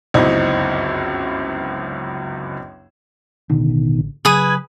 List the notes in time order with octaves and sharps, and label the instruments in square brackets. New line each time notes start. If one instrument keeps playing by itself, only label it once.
[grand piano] G1 C#2 F#2 C4 D#4 E4
[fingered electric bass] A1 D3 [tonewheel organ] B2 D#3
[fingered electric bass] C#3 F#3 [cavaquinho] G#4 B4 D#6 [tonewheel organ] G#6